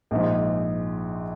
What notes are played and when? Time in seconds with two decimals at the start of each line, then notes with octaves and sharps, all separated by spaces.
0.11 A#1 G#2 F3